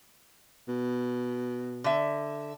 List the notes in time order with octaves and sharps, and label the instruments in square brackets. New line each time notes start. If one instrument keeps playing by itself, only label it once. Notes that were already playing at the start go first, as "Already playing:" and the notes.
[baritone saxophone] B2
[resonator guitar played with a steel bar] D3 E5